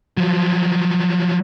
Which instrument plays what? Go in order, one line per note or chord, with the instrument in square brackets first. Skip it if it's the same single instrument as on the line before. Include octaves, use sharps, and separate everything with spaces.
[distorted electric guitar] F3 F#3